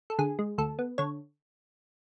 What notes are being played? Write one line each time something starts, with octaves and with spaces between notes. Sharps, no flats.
A4
D3 G#4
G#3
D2 A4
B3
D3 C#5